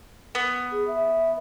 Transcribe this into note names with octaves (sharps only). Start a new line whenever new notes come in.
B3
G#4
E5